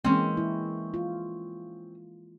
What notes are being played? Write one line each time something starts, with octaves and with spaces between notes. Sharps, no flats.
E3 G#3 A#3 C4 C#4
E4
F4